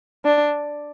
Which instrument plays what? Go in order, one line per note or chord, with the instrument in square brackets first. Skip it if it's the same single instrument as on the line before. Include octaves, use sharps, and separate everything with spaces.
[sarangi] D4